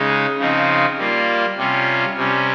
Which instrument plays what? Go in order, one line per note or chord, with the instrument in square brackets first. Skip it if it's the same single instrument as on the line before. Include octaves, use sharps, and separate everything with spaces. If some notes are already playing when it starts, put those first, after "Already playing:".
Already playing: [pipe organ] C#3 G#3 D#4
C#3 F3 C4 D#4
G3 A#3 F4
C3 G3 C#4 F4
C3 G3 C#4